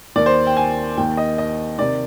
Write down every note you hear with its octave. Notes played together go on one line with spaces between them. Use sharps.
D#2 D#3 D5
C5
G5
G#5
D#2 D#3 G5
D#5
D#5
C3 D#3 D5